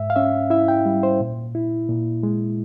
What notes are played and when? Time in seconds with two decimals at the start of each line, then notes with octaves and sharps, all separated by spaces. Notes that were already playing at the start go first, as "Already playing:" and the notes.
Already playing: G#2 E5
0.10 F5
0.16 C#4 E5
0.50 E4 E5
0.68 G5
0.86 G3
1.03 C5
1.20 A#2
1.55 E4
1.89 A#2
2.23 G#3